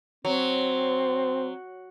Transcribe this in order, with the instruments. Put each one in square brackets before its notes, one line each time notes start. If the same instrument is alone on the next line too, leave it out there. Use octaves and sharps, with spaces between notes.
[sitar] F#3 [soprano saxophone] C4